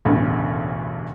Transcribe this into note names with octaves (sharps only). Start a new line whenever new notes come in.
E1 A1 D2 G2 C#3